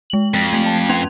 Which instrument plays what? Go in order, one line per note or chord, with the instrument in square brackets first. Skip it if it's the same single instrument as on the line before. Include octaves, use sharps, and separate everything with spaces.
[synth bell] G#3 F#7
[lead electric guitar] F2
[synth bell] A3 G#6 B6
A5
C#4 G#6 F7